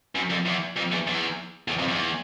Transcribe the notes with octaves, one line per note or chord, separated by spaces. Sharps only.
F#2
F2
E2
F2
E2
E2
E2
F2
E2